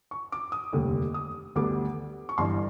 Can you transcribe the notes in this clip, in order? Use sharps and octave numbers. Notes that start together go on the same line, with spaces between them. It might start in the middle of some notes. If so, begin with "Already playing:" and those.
C#6
D6
D#6
F1 D#2 D3 G3
D#6
D2 D3 G3 B3 D6
C#6
G1 G2 E3 C6